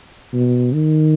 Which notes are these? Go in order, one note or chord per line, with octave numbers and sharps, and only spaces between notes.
B2
D#3